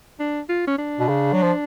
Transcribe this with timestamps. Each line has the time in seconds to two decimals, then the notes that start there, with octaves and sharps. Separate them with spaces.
0.20 D4
0.49 F4
0.67 C#4
0.78 D4
0.99 B2
1.08 C#3
1.33 F#3
1.42 F3